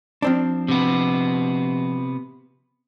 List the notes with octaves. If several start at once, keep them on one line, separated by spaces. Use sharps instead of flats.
F3 C4 D4
C3 B3